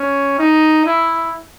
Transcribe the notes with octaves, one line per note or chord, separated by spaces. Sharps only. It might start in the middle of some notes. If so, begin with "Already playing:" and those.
Already playing: C#4
D#4
E4